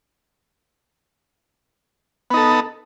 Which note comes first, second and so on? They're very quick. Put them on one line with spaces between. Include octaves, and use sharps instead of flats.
B3 D#4 A4